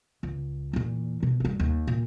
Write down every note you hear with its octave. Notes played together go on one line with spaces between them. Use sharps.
C#2
E2 A#2
B2
F#1 G2
D#2
A#2